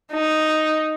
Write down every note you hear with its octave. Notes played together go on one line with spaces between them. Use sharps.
D#4